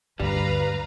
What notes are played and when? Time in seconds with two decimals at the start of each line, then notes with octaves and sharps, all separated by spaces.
0.20 D2 G2 G3 B4 F5 A#5